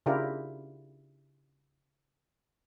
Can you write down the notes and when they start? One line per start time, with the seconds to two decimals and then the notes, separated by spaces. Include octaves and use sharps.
0.06 C#3 D4 E4 F4 G4 A#4